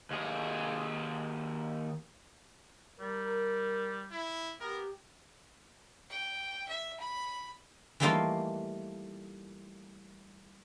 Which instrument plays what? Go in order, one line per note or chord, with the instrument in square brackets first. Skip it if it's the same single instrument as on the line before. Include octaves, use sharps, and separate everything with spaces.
[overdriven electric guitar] D#2 G#4
[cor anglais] G3 [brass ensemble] A#4
[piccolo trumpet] E4
[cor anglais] B3 [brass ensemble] G4 [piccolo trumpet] A#4
[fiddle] G5
E5
B5
[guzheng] E3 G3 A3 A#3 D#4 F4